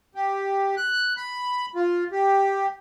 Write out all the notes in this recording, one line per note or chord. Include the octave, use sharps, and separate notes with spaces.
G4
F#6
B5
F4
G4